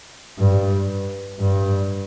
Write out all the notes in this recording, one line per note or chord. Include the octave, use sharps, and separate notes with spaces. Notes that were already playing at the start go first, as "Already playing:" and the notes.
G2
G2